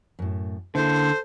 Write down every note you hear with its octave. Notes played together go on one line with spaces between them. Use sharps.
F#2 A2
D3 A#3 C#4 E4 A4 C5